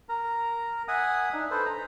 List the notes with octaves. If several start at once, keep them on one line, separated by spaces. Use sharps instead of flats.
A#4 A#5
E5 F#5 G#5 D#6
D4 D#4
A4 B4 C5
A#5